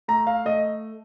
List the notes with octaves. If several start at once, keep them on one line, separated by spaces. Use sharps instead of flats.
A3 A#5
F5
A3 D#5